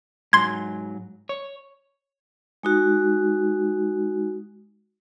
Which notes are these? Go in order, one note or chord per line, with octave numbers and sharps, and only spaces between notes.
G#2 F#3 C6 G#6
C#5
G#3 D#4 F#4